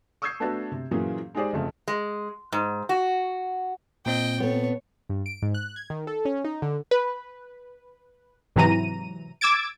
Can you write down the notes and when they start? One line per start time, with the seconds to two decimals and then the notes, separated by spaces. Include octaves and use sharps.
0.22 C#6 D#6 E6 G6 G#6 C7
0.40 A3 B3 D4 F#4 A4 B4
0.72 C3
0.91 A#2 E3 F#3 A#3 C#4 G#4
1.35 G#3 D#4 G4 G#4 C5 D5
1.53 F#1 F2 C#3 A3
1.88 G#3
2.52 G#2
2.89 F#4
4.06 A#2 C4 D#5 G5
4.40 B3 A4 C#5
5.09 G2
5.26 D7
5.42 G#2
5.54 F#6
5.76 G#6
5.90 D#3
6.07 A4
6.25 C#4
6.45 D#4
6.62 D3
6.91 B4
8.56 G#2 C3 E3 F#3 A#5 D#7
9.41 D6 E6 G#6 A6 D7